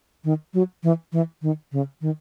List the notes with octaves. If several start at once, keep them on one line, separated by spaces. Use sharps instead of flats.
D#3
F#3
E3
E3
D#3
C#3
D#3